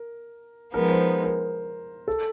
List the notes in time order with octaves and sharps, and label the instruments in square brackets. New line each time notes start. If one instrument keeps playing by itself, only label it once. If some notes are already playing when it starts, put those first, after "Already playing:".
Already playing: [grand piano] A#4
[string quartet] F3 G#3 B3 D#4 [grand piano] A#4
[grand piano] C5
A#4
A4